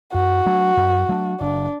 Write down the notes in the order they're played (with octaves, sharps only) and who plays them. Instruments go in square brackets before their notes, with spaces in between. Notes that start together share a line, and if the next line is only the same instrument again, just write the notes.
[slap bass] F#2 [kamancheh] F#4
[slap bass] F#3 A3 D4
F#2
F#3 A3 D4
[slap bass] F#1 [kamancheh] D4